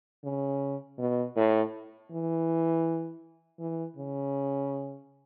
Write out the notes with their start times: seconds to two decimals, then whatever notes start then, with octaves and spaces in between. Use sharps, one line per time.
0.24 C#3
0.99 B2
1.36 A2
2.11 E3
3.59 E3
3.97 C#3